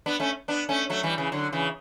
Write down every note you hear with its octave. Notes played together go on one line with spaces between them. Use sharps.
B3 D4
A3 C#4
B3 D4
A3 C#4
F#3 A3
E3 G3
C#3 E3
D3 F#3
C#3 E3